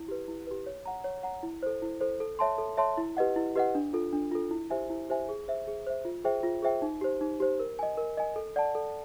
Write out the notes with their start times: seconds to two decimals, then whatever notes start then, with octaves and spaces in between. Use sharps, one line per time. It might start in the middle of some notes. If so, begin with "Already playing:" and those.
Already playing: E4
0.08 G4 B4
0.28 E4
0.47 G4 B4
0.66 C#5
0.86 F#5 A#5
1.04 C#5
1.23 F#5 A#5
1.43 E4
1.63 A4 C5
1.82 E4
2.01 A4 C5
2.20 A4
2.39 C#5 E5 A5 C6
2.58 A4
2.77 C#5 E5 A5 C6
2.98 E4
3.17 G4 B4 D#5 F#5
3.36 E4
3.55 G4 B4 D#5 F#5
3.75 D4
3.93 F4 A4
4.13 D4
4.31 F4 A4
4.51 E4
4.70 G4 C5 E5 G#5
4.90 E4
5.09 G4 C5 E5 G#5
5.29 G#4
5.48 C5 E5
5.67 G#4
5.87 C5 E5
6.05 F4
6.24 G#4 C5 E5 G5
6.43 F4
6.63 G#4 C5 E5 G5
6.82 D#4
7.01 G4 C5
7.21 D#4
7.40 G4 C5
7.60 A#4
7.79 D#5 G#5
7.97 A#4
8.17 D#5 G#5
8.36 A4
8.56 D5 F#5 A5
8.75 A4